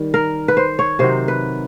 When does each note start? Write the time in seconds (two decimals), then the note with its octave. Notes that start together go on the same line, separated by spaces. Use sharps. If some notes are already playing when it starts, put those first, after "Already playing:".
Already playing: D#3 G3
0.14 A#4
0.48 B4
0.57 C5
0.79 C#5
0.99 C3 D#3 F#3 C5
1.28 B4